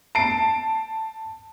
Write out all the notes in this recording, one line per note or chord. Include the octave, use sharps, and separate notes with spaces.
A5 C7 D7